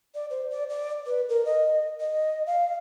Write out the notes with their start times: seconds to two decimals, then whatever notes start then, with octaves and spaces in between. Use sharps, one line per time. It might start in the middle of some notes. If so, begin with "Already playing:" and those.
0.15 D5
0.30 C5
0.51 D5
0.70 D5
1.06 B4
1.29 A#4
1.45 D#5
2.00 D#5
2.47 F5